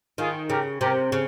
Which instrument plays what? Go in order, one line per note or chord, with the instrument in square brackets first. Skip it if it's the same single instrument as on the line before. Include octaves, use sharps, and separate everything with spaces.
[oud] D#3 [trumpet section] F4 G#4
[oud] C#3 [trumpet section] G4 A#4
[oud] C3 [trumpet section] G4 A#4
[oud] C#3